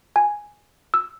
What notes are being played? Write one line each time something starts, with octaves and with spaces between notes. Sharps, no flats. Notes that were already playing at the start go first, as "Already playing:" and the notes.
G#5
E6